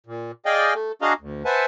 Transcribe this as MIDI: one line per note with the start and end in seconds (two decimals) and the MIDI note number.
0.06 0.31 46
0.46 0.74 68
0.46 0.74 74
0.46 0.74 75
0.46 0.74 77
0.46 0.74 79
0.46 0.74 80
0.74 0.92 57
1.02 1.13 62
1.02 1.13 66
1.02 1.13 68
1.02 1.13 75
1.02 1.13 77
1.02 1.13 82
1.20 1.43 38
1.45 1.66 71
1.45 1.66 72
1.45 1.66 76
1.45 1.66 78
1.45 1.66 80
1.45 1.66 81